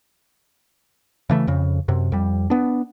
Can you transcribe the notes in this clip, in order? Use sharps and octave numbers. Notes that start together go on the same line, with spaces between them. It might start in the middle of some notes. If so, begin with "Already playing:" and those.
C#3 E3 A3
F2 C#3
F#2 C3
F2 G3
B3 D4